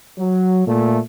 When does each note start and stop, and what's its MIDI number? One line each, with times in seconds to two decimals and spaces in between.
0.18 0.62 54
0.66 0.99 46
0.66 0.99 57